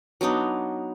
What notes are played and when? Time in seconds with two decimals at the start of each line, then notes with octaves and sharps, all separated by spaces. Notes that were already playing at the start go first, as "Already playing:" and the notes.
0.21 F#3 B3 D4 D#4